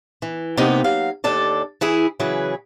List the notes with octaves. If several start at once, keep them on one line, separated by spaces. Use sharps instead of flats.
E3
C3 A#3 B3 D#4 G5
F#3 F5
D#2 D4 A4 D5
E3 E4 G#4
C#3 E3 F#3 G#4 B4